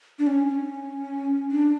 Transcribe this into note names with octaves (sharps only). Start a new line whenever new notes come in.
D4
C#4
C#4
D4